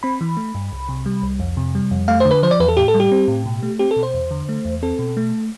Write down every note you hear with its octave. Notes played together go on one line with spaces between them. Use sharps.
C4 B5
E3
A3
G2
C2
C3
G3
C2
F2
C3
G3
F2
A3 F5
D3 C5
B4
F3 C5
D5
E2 B4
A4
A2 G4
A4
G3
G4
C4
A2
B2
A3
C4 G4
A4
B2
C5
E2
D3
A3
E2
C4 A4
B2
A3